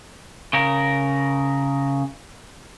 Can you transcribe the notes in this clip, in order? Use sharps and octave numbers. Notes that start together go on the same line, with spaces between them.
C#3 A#4